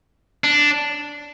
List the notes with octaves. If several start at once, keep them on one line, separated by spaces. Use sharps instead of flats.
D4